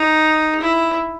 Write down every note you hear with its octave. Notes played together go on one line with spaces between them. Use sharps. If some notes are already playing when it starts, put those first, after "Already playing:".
Already playing: D#4
E4